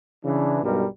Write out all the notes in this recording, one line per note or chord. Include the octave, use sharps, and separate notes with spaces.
C#3 E3 D4
B1 G2 B2 G3 G#3 A#4